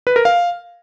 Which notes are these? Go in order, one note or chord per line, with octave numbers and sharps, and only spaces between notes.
B4
A#4
F5